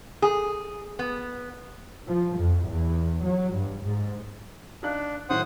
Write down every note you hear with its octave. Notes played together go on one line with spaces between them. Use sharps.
G#4
B3
F3
F2
E2
F#3
G2
G#2
D4 D#4 F5 F#6
A2 D#3 F#3 C5 F#5 D#6